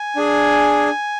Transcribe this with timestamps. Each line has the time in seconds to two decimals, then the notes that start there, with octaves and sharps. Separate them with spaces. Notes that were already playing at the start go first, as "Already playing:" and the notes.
Already playing: G#5
0.16 D4 G#4